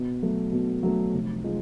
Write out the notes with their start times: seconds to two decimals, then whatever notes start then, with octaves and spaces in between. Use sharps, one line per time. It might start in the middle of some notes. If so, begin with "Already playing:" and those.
Already playing: B2
0.22 F#3 A3
0.52 B2
0.83 F#3 A3
1.14 F1
1.44 F3 G#3